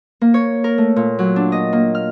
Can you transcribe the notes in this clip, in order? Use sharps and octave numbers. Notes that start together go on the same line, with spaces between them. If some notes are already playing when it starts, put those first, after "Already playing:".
A#3
C#5
A#4
A3
A#2
F#3
D4
D#5
A#3
F6